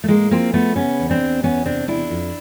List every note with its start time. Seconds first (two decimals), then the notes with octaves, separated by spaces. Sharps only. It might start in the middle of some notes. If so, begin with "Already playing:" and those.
0.04 A3
0.08 A2 G#3 A#3
0.31 F3 A#3 C4
0.53 F3 A3 B3
0.76 C#3 B3 C#4
0.99 E2
1.09 C4 D4
1.21 E2
1.43 E2 B3 C#4
1.65 C3 C4 D4
1.88 E2 D4 E4
2.10 F2